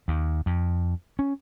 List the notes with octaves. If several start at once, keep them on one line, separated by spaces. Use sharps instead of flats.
D#2
F2
C#4